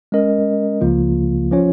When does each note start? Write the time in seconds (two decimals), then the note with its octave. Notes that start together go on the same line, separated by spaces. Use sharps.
0.12 G#3 C#4 A#4 D#5
0.81 C#2 C#3 F3 A#3 F4
1.51 F3 C#4 F4 C#5